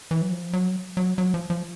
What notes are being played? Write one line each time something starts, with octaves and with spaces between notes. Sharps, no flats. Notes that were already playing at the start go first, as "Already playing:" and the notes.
E3
F#3
F3
F#3
F#3
F#3
F3
F3